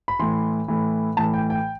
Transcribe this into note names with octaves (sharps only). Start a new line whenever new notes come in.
B5
A2 E3 C6
A2 E3
A2 E3 A5
G5
G5